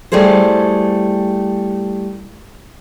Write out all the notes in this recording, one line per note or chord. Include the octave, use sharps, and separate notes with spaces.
G3 A3 E4 G#4 C5